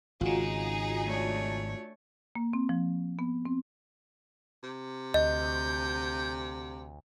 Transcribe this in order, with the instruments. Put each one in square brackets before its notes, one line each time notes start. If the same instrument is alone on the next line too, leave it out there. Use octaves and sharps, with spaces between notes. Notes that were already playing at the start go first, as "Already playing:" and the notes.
[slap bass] G#1 C#3 [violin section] D#4 G#4 [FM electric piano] F4 F#4
[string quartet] A3 D4 C#5
[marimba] A#3
C4
F3
B3
C4
[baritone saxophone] C3
[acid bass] D2 [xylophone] D#5 [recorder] G6